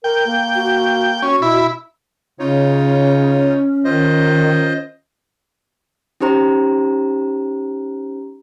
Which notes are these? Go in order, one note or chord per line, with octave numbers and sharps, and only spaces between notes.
A#4 G5
A#3
F#4
C#4 F#4
B2 E4 B5
C#3 C#4 D#4 F4 C#5
D#3 F4 C5 D#5
C#4 D#4 G4 C5 A#5